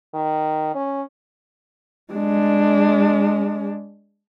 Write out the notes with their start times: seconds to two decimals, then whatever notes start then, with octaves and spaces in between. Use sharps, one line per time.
0.14 D#3
0.75 C#4
2.13 G#3 D4